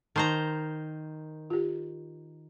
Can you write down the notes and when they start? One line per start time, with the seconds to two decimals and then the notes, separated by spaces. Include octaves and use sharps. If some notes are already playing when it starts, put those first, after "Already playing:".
0.16 D#3 C5 A5 A#5 C6 C#6
1.50 F4 G4